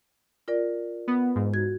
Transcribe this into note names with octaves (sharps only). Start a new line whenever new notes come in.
F4 A#4 D5
B3
G#2
F#4 G#6